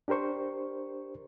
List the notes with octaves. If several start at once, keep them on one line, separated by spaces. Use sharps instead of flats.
D4 G4 A#4 C5 C#6